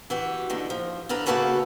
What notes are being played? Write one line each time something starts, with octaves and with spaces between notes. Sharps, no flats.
E3 F#4 G4
D#2 D3 D#3
F3
D3 G4 B4 F5 A#5
C#3 A#3 F#4 A4 B4 C#5